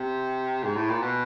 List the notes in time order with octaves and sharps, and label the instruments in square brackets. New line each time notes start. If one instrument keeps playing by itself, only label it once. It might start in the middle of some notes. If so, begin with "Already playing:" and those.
Already playing: [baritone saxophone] C3
G#2
A2
A#2
B2